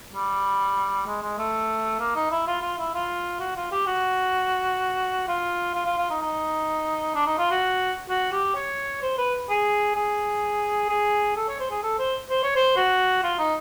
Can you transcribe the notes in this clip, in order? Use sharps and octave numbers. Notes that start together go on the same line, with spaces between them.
G3
G#3
G#3
A3
A#3
D#4
E4
F4
F4
E4
F4
F#4
F4
G4
F#4
F4
F4
F4
F4
D#4
D#4
D4
D#4
F4
F#4
F#4
G4
C#5
C5
B4
G#4
G#4
G#4
A4
C#5
C5
G#4
A4
C5
C5
C#5
C5
F#4
F4
D#4